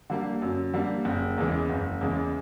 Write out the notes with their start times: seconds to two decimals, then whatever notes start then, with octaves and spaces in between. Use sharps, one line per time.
0.10 D3 G3 A#3
0.42 F#2
0.73 D3 G3 A#3
1.05 F#1
1.38 E2 C#3 E3 G#3
1.70 F#1
2.01 E2 C#3 E3 G#3